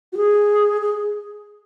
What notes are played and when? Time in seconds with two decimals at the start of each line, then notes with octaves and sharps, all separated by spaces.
0.13 F#4
0.17 G#4
0.82 G#4